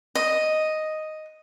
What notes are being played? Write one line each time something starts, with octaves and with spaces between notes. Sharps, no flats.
D#5